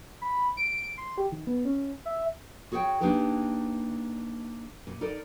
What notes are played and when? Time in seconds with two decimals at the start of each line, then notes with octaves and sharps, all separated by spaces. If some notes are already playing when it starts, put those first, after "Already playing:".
0.22 B5
0.57 D7
0.98 C6
1.18 G4
1.32 D#3
1.47 B3
1.65 C#4
2.05 E5
2.72 F#4 G#4 C#5 F5 G5
3.01 A#3 D4 D#4 G4 G#4 B4
4.87 A#2
5.01 D#4 A4 A#4 D5